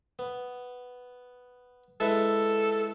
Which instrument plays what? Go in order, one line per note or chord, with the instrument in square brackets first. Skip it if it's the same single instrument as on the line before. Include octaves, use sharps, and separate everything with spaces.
[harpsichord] B3
[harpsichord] G#3 E4 B4 [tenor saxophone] A4